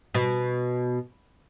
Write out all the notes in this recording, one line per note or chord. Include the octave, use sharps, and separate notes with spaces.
B2